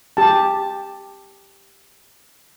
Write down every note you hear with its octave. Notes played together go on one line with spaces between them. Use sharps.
G4 A5